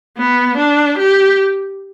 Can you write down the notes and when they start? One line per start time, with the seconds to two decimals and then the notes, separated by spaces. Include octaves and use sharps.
0.17 B3
0.57 D4
0.98 G4